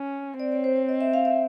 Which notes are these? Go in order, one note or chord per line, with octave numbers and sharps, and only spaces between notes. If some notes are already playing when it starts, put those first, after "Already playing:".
Already playing: C#4
C4 D5
C#5
C5
C#5
D#5
E5
F5
E5